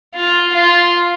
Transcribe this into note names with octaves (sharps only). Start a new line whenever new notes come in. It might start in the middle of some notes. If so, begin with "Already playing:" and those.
F4
F4